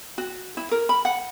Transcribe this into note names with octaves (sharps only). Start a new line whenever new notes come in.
F#4
E4
A#4
B5
F#5